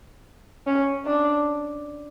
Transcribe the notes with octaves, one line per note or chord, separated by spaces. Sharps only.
C#4
D4